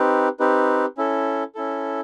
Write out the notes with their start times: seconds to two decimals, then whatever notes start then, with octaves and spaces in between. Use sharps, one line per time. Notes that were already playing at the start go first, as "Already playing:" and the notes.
Already playing: C4 D#4 G4 B4
0.40 C4 D#4 G4 B4
0.97 C#4 E4 A4
1.55 C#4 E4 A4